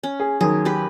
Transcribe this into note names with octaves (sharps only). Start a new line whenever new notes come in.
C#4
G#4
D#2 F#3 G#4
G4 B4